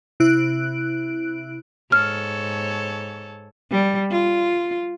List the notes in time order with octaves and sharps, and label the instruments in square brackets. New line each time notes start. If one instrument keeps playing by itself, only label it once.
[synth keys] C3 E4 F#6 D7
[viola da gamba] G#2 A4 C#5 [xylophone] F6
[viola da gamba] G3
F4